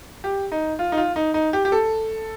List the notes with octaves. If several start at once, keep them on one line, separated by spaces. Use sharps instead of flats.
G4
D#4
F4
D#4
F4
D#4
D#4
G4
G4
A4